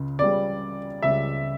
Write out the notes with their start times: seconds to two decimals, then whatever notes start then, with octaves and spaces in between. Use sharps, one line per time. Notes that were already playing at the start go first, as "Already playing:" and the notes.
Already playing: C#2 C#3
0.19 C#2 C#3 G3 D5
1.02 C#2 C#3 G3 E5